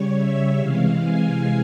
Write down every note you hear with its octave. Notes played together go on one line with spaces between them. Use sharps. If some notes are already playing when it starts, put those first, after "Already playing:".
Already playing: C#3 G3 C#5
E5
C3 E3 G#3 F5
G#5